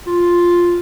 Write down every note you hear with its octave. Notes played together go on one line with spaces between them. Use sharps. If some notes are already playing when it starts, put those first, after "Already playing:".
F4